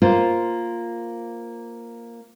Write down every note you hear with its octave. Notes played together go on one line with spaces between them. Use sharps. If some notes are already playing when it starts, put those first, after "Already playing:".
A#3 F4 C5